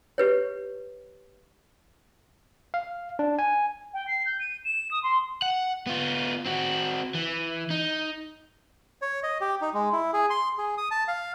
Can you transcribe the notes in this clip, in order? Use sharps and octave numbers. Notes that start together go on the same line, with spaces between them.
G4 B4 C#5
F5
D4
G#5
G5
C7
G6
D#7
E7
D#6
C6
F#5
B3 F4
C4 F#4
E3
D#4
C#5
D#5
G4
D#4
G#3
E4
G#4
C6
G#4
D#6
A5
F5